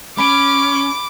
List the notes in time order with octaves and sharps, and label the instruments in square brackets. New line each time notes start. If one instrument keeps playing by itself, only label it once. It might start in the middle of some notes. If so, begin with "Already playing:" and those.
[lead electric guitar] C#4 [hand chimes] B5 D7 [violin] D6